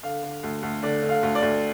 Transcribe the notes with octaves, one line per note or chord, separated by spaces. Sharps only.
D3 F5
D3
D2
D2
D3 D5
D3
F5
D2
D5
D2